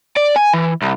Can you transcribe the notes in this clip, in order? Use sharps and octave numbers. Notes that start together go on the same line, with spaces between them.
D5
G#5
E3
C2